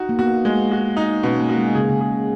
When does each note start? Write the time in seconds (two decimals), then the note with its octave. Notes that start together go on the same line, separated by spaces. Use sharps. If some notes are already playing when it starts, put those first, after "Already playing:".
Already playing: D#4 F#4
0.09 A#3
0.19 B3 F#4
0.45 G#3
0.72 F#4
0.97 D#4
1.23 B2 C#4
1.40 A#3
1.49 F#4
1.58 G#3
1.75 C#3 G#4
1.90 C#3
2.01 G#4